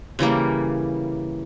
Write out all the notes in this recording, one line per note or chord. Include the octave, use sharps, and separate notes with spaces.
C#3 E3 G3 A#3